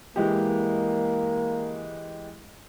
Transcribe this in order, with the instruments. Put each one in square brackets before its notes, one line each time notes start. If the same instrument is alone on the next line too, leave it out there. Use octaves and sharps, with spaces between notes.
[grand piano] E3 G#3 G4 [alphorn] A#3